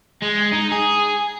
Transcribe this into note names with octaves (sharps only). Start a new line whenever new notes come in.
G#3
D#4
G#4